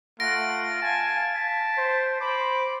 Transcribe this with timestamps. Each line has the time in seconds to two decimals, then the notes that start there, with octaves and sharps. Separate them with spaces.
0.20 A3 F4 F#5 A#6 D7
0.82 F5 G#5 A5
1.35 A5 B6
1.78 C5
2.21 C5 B5 D6